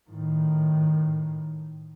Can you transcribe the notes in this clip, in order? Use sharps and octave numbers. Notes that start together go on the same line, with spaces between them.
A2 D#3